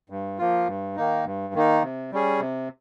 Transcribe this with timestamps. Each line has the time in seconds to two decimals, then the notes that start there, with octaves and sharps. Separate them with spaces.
0.10 G2
0.39 F3 A#3 F4
0.67 G2
0.96 D#3 A#3 D#4
1.25 G2
1.54 D#3 A#3 D#4
1.82 C3
2.12 G3 C#4 G#4
2.40 C3